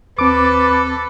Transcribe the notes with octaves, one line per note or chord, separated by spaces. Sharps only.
D#2 C4 A4 B4 D6